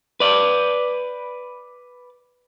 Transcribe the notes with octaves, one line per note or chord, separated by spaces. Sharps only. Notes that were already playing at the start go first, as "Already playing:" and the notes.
B4 D5